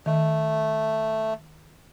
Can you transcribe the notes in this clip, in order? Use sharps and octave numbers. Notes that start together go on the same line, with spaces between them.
D#3 A3